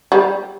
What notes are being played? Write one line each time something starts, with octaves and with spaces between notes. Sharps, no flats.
G3